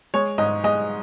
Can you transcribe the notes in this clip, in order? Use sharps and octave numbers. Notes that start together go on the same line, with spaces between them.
G#3 C#5
G#2 D#5
G#3 D#5